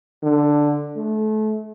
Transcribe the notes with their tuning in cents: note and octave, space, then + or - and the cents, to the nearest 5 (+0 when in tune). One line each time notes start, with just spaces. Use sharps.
D3 +5
A3 -30